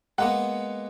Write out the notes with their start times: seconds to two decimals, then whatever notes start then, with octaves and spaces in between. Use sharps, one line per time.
0.18 G#3 A#3 B3 F#5